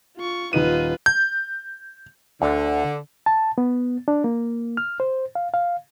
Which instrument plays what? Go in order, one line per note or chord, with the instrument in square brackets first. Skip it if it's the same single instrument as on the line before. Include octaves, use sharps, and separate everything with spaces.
[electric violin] F4 C#6
[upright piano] D#1 D#4 D#7 [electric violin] F4 B4
[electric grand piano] G6
[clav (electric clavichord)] D2 [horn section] D3
[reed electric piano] A5
B3
D4
A#3
F6
C5
F5
F5